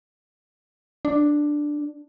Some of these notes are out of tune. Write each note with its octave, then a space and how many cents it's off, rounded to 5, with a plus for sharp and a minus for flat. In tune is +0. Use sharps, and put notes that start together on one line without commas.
D4 +5